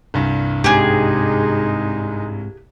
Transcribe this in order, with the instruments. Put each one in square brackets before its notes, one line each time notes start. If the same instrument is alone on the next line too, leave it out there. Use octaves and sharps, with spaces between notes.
[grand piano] C2 G2
[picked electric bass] G#2 C3 [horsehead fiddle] G#3 D#4 [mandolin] G4 G#4